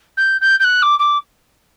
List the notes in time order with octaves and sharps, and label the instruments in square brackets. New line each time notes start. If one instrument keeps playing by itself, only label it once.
[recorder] G6
G6
G6
F#6
D6
D6